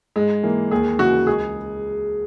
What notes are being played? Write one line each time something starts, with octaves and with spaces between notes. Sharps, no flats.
G#2 G#3
E3 A#3
D#2 G#4
C#3 E3 F#4
C#2 G#4